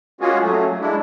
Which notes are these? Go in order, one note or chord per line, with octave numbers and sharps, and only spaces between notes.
G#3 A#3 C#4 F4 F#4 G#4
F#3 A3
G#3 D4 E4